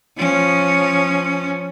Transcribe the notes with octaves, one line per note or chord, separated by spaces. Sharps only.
F3 C#4